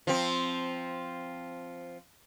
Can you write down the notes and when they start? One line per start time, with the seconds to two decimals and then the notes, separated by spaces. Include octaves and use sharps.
0.07 F3 C4